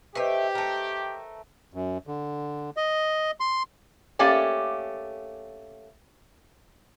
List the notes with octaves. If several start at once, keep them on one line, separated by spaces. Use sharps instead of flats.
A3 G4 B4 C5 D#5 E5
A3 A#4
F#2
D3
D#5
C6
A3 A#3 C#4 G4 D5 G#5